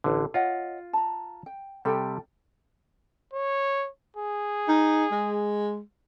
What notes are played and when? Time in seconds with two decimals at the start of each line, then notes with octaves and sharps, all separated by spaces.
0.04 A1 D3
0.34 F4 C#5 D#5 F#5
0.93 A5 A#5
1.46 G5
1.85 C3 G3 A4 G5
3.34 C#5
4.17 G#4
4.68 D#4
5.12 G#3